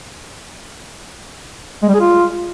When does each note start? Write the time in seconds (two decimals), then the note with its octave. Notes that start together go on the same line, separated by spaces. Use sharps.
1.83 G#3
1.89 G3
1.94 G#4
2.00 F4